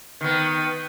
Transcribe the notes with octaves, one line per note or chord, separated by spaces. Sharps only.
D#3 B3